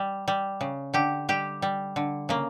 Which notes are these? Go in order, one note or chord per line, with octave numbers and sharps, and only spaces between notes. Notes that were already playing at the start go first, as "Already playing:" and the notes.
Already playing: G3
G3
C#3
D3 G4
G3 G4
G3
D3
C#3 A#3